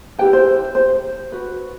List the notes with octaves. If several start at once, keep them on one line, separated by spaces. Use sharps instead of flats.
E4 G4 B4 G5
C5
C5
F#4 B4